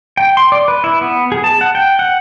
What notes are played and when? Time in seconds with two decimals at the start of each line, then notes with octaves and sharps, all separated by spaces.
0.17 G5
0.37 C6
0.52 D5
0.68 B4
0.84 E4
1.01 B3
1.32 G#4
1.44 A5
1.61 F#5
1.75 G5
1.99 F#5